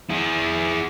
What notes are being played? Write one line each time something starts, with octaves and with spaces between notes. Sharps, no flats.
E4 G#4